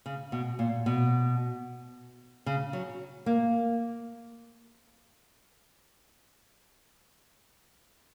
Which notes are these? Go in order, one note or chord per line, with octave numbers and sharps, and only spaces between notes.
C#3
B2
A#2
B2
C#3
F#3
A#3